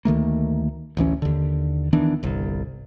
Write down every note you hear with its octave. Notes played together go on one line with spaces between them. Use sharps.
D2 D#3 A3 A#3
A1 D2 E3 C#4
D#2 D3
D#3 E3 B3 D4
G1 C2